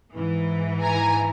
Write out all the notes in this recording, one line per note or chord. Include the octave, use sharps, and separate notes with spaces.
G#2 E3
G#5 A#5